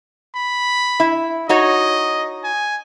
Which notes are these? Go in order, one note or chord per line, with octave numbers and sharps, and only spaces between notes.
B5
E4
D#4 F#4 C#5 D#5
G#5